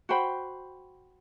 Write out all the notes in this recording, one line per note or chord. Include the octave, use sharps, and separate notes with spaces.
F#4 C5 G5 B5